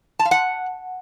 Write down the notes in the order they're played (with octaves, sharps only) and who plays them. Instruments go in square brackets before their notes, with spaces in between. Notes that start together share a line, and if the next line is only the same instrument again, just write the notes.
[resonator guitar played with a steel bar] A5
F5
F#5